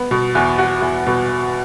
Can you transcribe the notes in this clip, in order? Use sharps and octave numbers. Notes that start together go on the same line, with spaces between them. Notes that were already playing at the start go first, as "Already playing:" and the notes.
Already playing: B3
B2
E2
F#4
E2
B2